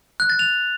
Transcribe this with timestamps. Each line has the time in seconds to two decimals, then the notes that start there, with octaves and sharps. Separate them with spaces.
0.20 F#6
0.30 A6
0.39 F7